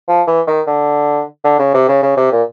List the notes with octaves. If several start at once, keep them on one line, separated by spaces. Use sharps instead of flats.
F3
E3
D#3
D3
D3
C#3
C3
C#3
C#3
C3
A#2